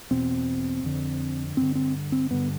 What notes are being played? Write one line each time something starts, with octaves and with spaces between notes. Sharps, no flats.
E2 B2 C4
F2 D3
G2 D3 C4
C4
C4
G2 D3 B3